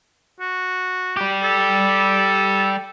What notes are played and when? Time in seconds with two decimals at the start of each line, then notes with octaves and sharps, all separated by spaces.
0.41 F#4
1.17 G3 G4
1.43 A4